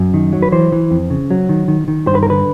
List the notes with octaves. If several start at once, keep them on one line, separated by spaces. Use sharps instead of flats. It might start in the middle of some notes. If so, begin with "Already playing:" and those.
Already playing: F#2
D#3
F#3
B4
E3 C5
E3
F2
C#3
F#3
D#3
D#3
D#3
G2 C5
B4
A#4
D3 B4